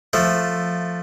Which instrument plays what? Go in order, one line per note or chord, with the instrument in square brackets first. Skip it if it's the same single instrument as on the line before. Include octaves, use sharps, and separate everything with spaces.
[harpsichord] F3 A3